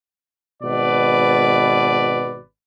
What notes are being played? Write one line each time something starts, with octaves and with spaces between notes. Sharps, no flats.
G#1 B2 B4 D5